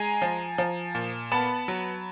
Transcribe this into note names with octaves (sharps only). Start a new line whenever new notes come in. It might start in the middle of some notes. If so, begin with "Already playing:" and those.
Already playing: G#3 G#5 A#5
F3
F3
A#2
B3 A5 B5
F#3